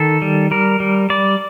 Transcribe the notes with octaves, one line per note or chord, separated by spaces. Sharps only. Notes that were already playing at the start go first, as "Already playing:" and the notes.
Already playing: D#3 A4
G3
G3 A#4
G3
G3 D5